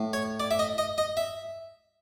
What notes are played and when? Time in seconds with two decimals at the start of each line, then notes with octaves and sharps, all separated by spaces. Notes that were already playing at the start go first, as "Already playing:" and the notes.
Already playing: A2
0.13 C#5
0.40 D5
0.51 E5
0.59 D#5
0.78 D#5
0.98 D#5
1.17 E5